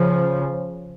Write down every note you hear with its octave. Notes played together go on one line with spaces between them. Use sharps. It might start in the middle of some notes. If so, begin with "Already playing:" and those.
Already playing: C#3 F3